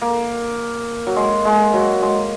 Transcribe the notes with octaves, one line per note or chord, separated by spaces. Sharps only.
A#3
F#3
G#3
G#3
F#3
G#3